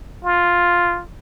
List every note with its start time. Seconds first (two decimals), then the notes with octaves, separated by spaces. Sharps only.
0.25 F4